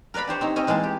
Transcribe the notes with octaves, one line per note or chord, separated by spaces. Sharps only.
A#4 B4 D5 F5 B5
D4 G4 C5 C#5
C4 D#4 C#5
C4 C#4 D#5 G#5 A#5
E3 G#3 A#3 G#4 A5
G4